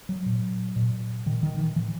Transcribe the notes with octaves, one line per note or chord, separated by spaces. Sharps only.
F#3
A#2
A#2
A#2 D#3
D#3
E3
A2 E3